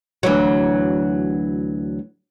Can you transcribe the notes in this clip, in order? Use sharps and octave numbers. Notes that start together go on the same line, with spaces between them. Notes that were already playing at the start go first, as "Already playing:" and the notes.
D2 E3 F#3